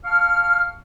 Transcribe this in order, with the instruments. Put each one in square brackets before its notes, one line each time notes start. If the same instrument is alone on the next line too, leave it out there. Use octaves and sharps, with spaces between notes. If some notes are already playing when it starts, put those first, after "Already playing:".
[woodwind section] F5 A5 C#6 F6